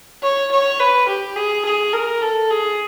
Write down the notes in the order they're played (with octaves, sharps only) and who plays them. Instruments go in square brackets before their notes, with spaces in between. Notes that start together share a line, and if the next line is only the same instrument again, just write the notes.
[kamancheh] C#5
C#5
B4
G4
G#4
G#4
A#4
A4
G#4